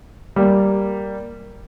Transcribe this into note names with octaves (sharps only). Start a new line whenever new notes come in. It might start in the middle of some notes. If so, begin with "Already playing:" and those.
G3 A#3